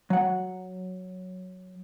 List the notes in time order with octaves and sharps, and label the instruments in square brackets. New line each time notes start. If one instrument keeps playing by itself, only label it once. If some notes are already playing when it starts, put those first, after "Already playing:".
[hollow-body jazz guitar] F#3 F#5